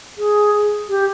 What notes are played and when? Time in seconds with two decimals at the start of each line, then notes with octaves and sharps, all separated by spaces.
0.18 G#4
0.89 G4